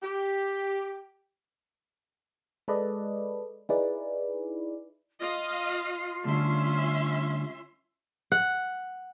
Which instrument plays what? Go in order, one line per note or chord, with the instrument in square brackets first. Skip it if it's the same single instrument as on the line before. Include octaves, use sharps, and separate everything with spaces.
[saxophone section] G4
[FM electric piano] G#3 A4 B4 D5 D#5
D#4 E4 G#4 B4 D5
[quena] F4 [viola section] D#5 F5
[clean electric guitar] D3 G3 A3 [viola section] C#4 E5 C6
[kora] F#5